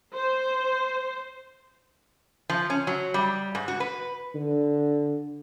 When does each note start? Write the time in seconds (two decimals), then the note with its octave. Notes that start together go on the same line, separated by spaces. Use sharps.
0.15 C5
2.50 F3
2.70 C#4
2.87 F#3
3.14 G3
3.55 G#2
3.68 F#4
3.80 B4
4.35 D3